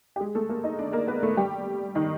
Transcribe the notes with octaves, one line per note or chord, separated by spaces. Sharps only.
G4
G#3 G#4
A3 A4
A#3 A#4
D#4 D#5
D4 D5
A#3 A#4
B3 B4
A3 A4
G3 G4
D#3 D#4